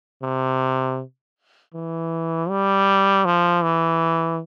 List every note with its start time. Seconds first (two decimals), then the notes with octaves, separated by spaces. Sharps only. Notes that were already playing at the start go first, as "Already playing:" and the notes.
0.23 C3
1.74 E3
2.49 G3
3.25 F3
3.62 E3